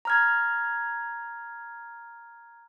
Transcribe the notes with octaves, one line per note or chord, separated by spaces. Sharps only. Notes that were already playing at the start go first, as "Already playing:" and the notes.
A#5 F6 G#6